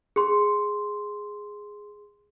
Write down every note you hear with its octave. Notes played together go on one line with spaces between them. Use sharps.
G#4 C6